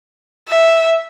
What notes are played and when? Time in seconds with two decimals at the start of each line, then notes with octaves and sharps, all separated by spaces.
0.49 E5